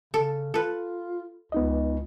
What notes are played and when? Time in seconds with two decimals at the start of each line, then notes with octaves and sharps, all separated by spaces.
0.14 C#3 A4
0.54 F4 A4 B4
1.52 C#2 B3 D#4 D#5